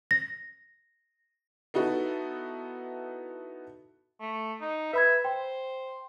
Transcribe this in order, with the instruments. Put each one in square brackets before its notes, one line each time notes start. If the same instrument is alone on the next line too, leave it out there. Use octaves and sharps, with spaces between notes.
[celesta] A#6
[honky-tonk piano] B3 D#4 E4 F#4 A4
[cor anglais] A3
D#4
[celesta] B4 B5 G#6 [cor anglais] E5
[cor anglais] C5 [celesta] G5